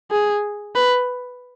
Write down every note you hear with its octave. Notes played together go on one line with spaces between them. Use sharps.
G#4
B4